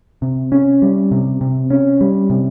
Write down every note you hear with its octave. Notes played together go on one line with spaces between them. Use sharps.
C3
C#4
G3
C3
C3
C#4
G3
C3